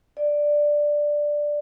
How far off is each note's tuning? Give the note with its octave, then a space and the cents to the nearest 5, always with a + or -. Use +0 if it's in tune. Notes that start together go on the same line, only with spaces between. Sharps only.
D5 +5